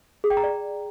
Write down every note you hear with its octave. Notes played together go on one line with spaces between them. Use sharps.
G#4
G5
A#5
D5